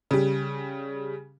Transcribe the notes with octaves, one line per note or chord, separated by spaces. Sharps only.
C#3 G3